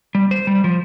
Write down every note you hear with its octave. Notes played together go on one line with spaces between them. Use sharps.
G3
C5
G3
F3